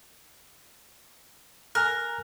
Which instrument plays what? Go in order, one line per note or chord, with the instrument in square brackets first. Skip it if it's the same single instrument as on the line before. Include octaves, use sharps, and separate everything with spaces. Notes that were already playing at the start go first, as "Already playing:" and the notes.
[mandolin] A#4 [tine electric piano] G#5 F6 F#6